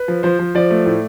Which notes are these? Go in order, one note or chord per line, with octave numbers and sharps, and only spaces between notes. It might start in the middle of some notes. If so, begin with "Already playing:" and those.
Already playing: B4
F3
F3 C5
F3
F3 D5
A3
A2